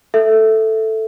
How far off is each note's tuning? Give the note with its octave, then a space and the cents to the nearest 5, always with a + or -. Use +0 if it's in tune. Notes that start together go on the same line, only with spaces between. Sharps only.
A4 +0 E5 +0